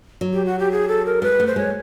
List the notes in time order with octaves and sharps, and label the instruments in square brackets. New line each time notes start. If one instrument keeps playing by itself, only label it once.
[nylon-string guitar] F#3
[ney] G4
F#4
G4
G#4
A4
A#4
[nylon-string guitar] G#3 [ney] B4
[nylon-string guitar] A3
[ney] C5
[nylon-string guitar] G#3 [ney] C#5